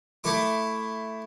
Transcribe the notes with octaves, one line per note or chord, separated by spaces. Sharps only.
A3 E4 D6